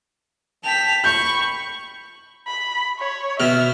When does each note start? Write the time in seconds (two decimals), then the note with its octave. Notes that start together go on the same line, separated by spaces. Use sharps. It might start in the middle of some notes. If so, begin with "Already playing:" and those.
0.64 G5 A5 B6 F7
1.04 B5 C#6 G6
2.47 B5
2.99 C#5
3.40 B2 E5 F6